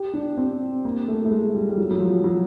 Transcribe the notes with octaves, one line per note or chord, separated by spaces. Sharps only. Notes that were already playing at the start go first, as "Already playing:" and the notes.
Already playing: G4
D4
C4
A#3
A3
A3
G#3
G3
G3
F#3
F#3
F3
F#3